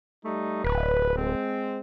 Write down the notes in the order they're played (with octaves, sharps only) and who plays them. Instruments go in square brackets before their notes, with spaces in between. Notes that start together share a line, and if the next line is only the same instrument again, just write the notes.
[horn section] G3 A3 D#4
[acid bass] D1 [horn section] B4
[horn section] G#3 C4